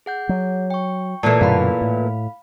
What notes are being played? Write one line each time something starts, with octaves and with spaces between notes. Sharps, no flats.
G#4 F#5 G6
F#3
G5 C#6
A#2 E3 A3 A5 C7
F#2 B2 D3 F5 B5
A2